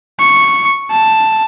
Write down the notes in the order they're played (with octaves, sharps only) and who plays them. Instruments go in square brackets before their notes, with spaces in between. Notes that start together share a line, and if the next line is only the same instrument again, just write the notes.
[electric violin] C#6
A5